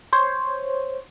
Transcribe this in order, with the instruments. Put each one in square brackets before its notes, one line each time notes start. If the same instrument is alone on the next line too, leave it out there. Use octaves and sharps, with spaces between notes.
[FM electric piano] C5 C#5